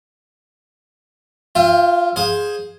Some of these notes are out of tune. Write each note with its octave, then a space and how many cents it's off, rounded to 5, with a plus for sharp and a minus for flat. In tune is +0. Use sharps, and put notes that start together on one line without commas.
F4 +0 E5 +45 G5 +15
G#4 +0 C5 +5 F5 +35